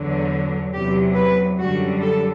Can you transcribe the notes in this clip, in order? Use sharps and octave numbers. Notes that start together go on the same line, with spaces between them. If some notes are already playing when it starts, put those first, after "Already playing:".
Already playing: E2 D3 F#3
E2 C3 F#3 G4
B4
F#2 D3 G3 F#4
A4